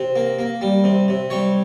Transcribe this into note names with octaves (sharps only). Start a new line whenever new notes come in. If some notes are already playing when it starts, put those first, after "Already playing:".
Already playing: C3
A#3
A#3
G3
C3
C3
G3 C#5